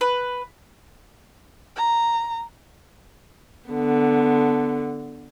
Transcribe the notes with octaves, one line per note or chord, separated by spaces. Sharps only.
B4
A#5
D3 B3